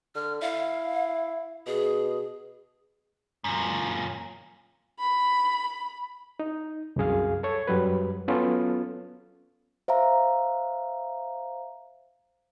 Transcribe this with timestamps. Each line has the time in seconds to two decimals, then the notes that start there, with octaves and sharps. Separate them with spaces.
0.15 D3 F6
0.42 E4 F5
1.67 B2 G#4
3.44 F#2 A#2
5.00 B5
6.40 D#4
6.96 C2 F#2 G#4 F5
7.43 A4 C#5 G#6
7.67 F#2 F#3 G3 B4
8.28 F#3 B3 C#4 F4 A4
9.88 C5 E5 F5 A#5